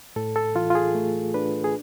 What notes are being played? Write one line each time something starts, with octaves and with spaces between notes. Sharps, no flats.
A2 A4
A4
E3 F4
F4
G#4
A3
D4 B4
G#4